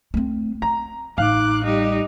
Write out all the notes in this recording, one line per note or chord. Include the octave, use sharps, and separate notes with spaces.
A3 C4
C#4 A#5
A1 D#4 F5 D6 F#6
G3 D#4 G4